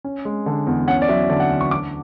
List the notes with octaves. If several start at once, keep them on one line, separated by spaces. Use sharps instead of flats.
C#4
G#3
D3
E2
C#4 F#5
D5
F#3 E5
D3 D5
F#5
D2
C#6
D4 D6